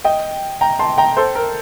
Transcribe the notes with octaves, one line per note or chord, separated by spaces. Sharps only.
D#5 G5
G5 A#5
A5 C6
G5 A#5
A4 C5
A#4